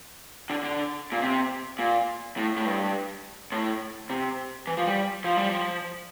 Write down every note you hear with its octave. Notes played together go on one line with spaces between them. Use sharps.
D3
D3
A#2
C3
A#2
A2
A2
G2
A2
C3
E3
F3
G3
F3
G3
F3